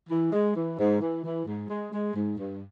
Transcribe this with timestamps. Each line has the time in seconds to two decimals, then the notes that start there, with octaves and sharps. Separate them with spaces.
0.10 E3
0.32 G#3
0.55 E3
0.79 G#2
1.00 E3
1.24 E3
1.46 G#2
1.68 G#3
1.92 G#3
2.14 G#2
2.37 G2